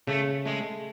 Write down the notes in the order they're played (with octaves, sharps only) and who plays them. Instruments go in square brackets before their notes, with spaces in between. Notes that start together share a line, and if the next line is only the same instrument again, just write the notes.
[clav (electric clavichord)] C#3 [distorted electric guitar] A3
[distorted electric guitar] G#3 [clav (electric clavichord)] A3